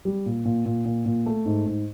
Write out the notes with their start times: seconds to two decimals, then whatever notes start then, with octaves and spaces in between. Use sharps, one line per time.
0.05 G3
0.26 A#2
0.45 A#2
0.66 A#2
0.85 A#2
1.06 A#2
1.26 A3
1.46 G#2
1.66 G#2